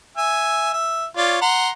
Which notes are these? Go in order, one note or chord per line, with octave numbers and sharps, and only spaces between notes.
E5 G#5
E5
F4 C#5 D5
F#5 A#5 C6